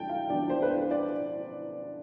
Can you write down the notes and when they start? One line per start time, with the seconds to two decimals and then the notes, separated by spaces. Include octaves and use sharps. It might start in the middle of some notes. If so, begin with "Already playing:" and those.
Already playing: D2 D3 F3 G5 A5
0.09 F5
0.30 D2 D3 F3 B3 D5
0.49 C5
0.62 B4
0.70 C5
0.91 D5